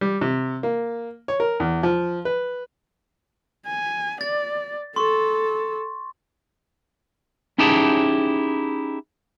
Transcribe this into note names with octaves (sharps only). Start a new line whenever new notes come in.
G3
C3
A#3
C#5
A#4
E2
F3
B4
G#5
D5 A6
A4 C6 C#6
C#4 D#4 E4 G4 G#4 A5